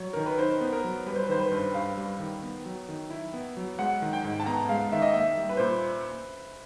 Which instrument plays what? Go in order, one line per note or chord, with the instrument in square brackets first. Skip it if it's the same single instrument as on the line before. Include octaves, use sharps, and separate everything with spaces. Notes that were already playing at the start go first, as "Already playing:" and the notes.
Already playing: [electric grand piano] F#3 [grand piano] C#5
[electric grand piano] D#3 [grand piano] A#4
[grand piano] B4
[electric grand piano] D#4 [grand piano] C5
[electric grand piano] B3
[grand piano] A#4
[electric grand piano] F#3
[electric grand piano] G3 [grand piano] B4
[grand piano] C5
B4
[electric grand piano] D#3 [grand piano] C5
[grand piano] B4
C5
[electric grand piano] G2 [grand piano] B4
[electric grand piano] G2 [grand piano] F5
[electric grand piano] G3
D#3
B3
F#3
D#3
E4
B3
F#3
[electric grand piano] G#3 [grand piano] F#5
[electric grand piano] D#3
[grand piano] G5
[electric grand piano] G#2
[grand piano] A5
[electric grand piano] B3 [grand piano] A#5
[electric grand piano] G#3 [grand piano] F5
[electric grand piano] D#3 [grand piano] E5
[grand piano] D#5
[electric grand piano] A#3 [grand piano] E5
[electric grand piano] G3
[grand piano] B4
[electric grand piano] A#2 [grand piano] C5